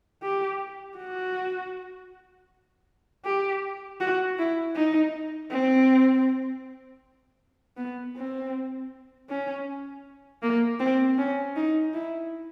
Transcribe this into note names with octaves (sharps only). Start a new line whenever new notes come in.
G4
F#4
G4
F#4
E4
D#4
C4
B3
C4
C#4
A#3
C4
C#4
D#4
E4